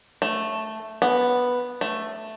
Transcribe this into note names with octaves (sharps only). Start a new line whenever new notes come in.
A3
B3
A3